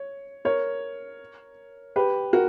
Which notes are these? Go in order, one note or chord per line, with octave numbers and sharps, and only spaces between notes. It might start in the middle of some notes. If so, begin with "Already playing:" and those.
Already playing: C#5
A#4 C#5
G4 B4
F#4 A#4